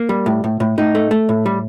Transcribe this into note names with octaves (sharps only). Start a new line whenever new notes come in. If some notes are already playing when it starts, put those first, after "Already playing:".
Already playing: A#3
G3
A2
A2
A2
A2 D#4
A3
A3
A2
G3